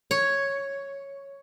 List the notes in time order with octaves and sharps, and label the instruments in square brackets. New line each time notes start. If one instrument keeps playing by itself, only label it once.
[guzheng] C#5